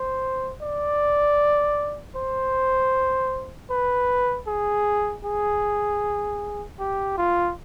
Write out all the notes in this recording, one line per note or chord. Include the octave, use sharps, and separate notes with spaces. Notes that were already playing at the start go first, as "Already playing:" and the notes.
Already playing: C5
D5
C5
B4
G#4
G#4
G4
F4